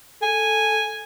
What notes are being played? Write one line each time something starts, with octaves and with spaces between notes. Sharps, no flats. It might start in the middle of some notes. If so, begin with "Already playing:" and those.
A4 G#5